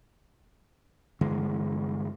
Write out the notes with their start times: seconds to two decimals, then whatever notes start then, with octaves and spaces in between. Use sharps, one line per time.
1.21 G2 D3 E3 G#3